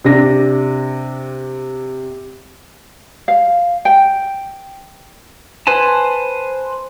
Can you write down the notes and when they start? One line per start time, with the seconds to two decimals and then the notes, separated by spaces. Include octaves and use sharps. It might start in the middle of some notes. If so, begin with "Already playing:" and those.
0.05 C3 D4 A#6
3.28 F5
3.85 G5
5.67 B4 C5 G#5 A5